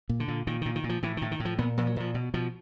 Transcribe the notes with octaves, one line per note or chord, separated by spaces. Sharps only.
A#2
D3
A#2
A#2 D#3
A#2 D#3
D#3
A#2
F3
A2 E3
A2 D#3
D#3
A2
F3
A#2 B3
A#2 F3
F#3
A#2 F3
B2
B2 F3